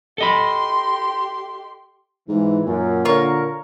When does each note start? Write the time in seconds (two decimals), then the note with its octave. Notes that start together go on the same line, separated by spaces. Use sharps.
0.18 G4 A4 D#5 B5 C6
2.28 G#2 E3
2.65 F#2 A#2
3.05 D3 F4 A#4 C#5